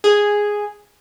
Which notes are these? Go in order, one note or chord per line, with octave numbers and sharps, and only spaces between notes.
G#4